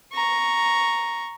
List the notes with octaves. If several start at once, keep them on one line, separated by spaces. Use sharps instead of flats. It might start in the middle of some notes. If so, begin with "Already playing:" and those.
A#5 C#6